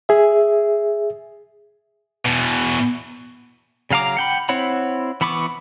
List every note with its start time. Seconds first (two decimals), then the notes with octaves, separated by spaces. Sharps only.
0.09 G#4 E5
2.25 E2 B2
3.91 C#3 F#3 F5 A#5 D6
4.17 F#5 G5 B5
4.49 C4 E4 C#5 F#5 B5
5.21 E3 B3 B5 C#6 D6